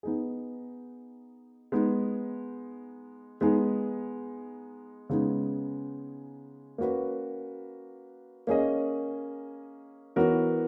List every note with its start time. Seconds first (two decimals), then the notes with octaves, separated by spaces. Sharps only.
0.03 B3 D#4 G#4
1.72 G#3 B3 D#4
3.41 G#3 B3 D#4 G#4
5.10 C#3 G#3 B3 D#4 G#4
6.78 A#3 C#4 F#4 B4
8.47 A#3 C#4 G#4 D#5
10.16 E3 B3 F#4 A#4 C#5